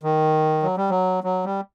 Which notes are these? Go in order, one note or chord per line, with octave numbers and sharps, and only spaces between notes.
D#3
F#3
G3
F#3
F#3
G3